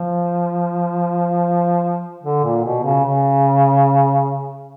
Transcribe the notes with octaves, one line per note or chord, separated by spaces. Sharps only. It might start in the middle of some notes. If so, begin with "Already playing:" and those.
Already playing: F3
D3
A#2
B2
C#3
C#3